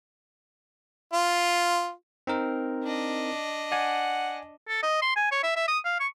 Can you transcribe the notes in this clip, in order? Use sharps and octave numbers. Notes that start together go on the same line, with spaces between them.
F4
C4 D#4 A#4
D4 D#5
D5 F#5 G#5
A4
D#5
C6
G#5
C#5
E5
E5
D#6
F5
C#6